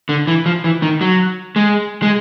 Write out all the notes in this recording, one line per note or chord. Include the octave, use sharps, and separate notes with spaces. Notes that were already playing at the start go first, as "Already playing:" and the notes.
D3
E3
F3
E3
D#3
F#3
G#3
G#3